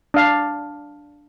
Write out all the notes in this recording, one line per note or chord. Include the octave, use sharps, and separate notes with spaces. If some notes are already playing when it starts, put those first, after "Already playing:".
D4 F5